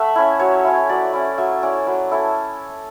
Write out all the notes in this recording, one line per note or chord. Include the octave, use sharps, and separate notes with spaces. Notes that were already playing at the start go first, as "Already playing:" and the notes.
Already playing: A3 E5 F#5
C#4 E4
F#3 C#5
C#4 E4
F#3 D5
C#4 E4
F#3 E5
C#4 E4 D5
F#3 B4
C#4 E4 A4